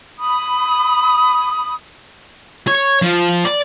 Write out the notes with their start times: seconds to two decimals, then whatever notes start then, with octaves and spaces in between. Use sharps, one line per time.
0.20 B5 D#6
2.67 C#5
3.02 F3
3.45 D5